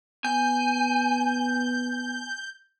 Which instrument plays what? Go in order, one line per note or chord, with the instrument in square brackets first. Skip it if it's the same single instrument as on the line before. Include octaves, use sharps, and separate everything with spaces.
[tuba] B3 [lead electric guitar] G#5 [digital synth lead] G6